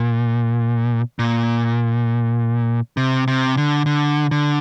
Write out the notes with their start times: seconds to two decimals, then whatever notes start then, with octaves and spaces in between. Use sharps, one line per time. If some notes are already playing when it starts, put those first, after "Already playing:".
Already playing: A#2
1.19 A#2
2.97 C3
3.28 C3
3.57 D3
3.86 D3
4.31 D3